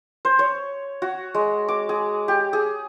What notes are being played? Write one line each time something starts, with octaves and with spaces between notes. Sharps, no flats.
C5
C#5
F#4
G#3
D6
G#4
G4
G#4